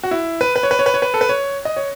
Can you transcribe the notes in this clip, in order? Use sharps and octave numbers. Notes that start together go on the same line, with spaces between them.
F#4
E4
B4
B4
C#5
B4
C#5
B4
C#5
B4
A4
B4
C#5
D#5
C#5